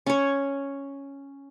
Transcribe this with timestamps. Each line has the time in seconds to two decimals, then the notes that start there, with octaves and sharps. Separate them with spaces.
0.06 C#4 C#5